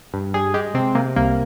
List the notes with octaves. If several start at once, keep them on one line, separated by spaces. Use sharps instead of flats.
G2
G3 G#4
G#3 G4
C3 C4
C3 A#3
C2 A#3